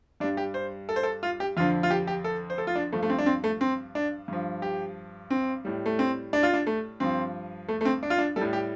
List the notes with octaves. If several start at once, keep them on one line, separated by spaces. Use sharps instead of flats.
G2 G3 D4
G4
C5
A4
C5
A4
F4
G4
F2 D3 F3 F4
F4
G4
G4
A4
C5
A4
F4
D4
G2 F3 A3
A3
C4
D4
C4
A3
C4
D4
G2 F3
G4
C4
A2 G3
A3
C4
D4
F4
D4
A3
G2 F3 C4
A3
A3
C4
D4
F4
D4
G3 A4
A2
G4